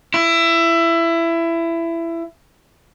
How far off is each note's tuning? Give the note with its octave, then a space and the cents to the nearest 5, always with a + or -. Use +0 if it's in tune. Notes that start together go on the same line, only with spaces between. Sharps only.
E4 +20